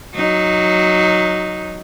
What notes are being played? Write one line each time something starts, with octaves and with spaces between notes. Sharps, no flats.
F#3 D#4